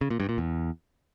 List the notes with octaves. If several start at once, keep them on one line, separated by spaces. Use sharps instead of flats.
C#3
A#2
G2
A#2
E2